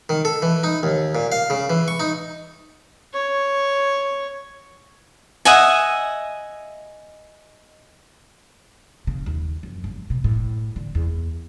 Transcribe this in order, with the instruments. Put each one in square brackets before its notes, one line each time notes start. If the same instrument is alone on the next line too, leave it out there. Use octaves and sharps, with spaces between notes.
[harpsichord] D#3
A4
E3
D#4
D#2
A#2
F5
C#3
E3
C#6
D#4
[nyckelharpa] C#5
[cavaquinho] D#5 E5 F#5 G#5
[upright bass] C#3
D#2
F#2
G1
B2
A2
D3
E2